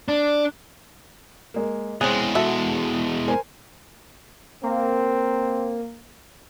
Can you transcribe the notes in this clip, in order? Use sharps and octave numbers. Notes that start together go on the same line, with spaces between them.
D4
G#3 A#3
E2 G#3 C4 C#4 G#4 F#6
F#4 A4 E5
A#4 C5 G#5
A#3 C4